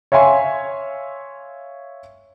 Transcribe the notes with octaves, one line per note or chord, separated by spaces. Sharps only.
C#5 E5 F5 G#5 C6 C#6